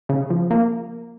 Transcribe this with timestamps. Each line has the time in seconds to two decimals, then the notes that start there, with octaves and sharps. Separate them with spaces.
0.09 C#3
0.30 F3
0.51 A#3